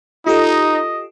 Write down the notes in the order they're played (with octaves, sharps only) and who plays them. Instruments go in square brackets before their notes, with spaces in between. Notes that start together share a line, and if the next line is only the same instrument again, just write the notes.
[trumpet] D#4 [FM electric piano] F4 G4 A4 [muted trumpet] D#5